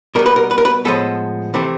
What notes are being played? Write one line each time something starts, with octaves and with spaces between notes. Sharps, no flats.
B2 G3 B3 A#4
B4
A#4
B4
A#4
B4
A2 F3 G#3 B3 A4
C3 E3 A3 C4